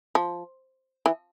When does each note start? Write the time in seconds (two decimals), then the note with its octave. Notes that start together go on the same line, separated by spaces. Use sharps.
0.15 F3
1.06 E3